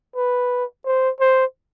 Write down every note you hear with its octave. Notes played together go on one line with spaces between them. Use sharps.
B4
C5
C5